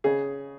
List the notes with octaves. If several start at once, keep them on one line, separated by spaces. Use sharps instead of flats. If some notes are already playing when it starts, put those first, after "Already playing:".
C#3 G#4